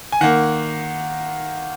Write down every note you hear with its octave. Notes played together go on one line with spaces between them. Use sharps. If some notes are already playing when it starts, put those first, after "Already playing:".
G#5
D#3 A#3 F#5